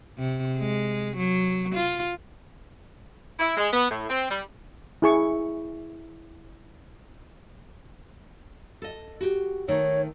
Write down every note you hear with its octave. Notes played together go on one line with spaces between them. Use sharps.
C3
G#3
F#3
F4
E4
G#3
B3
A2
C4
G3
E4 G#4 C#6
A4 D#5
F#4 G4
D#3 A3 D#4 C#5